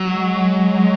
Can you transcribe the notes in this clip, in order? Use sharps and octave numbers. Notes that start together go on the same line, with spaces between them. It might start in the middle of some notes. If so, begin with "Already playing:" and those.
Already playing: F#3
G#3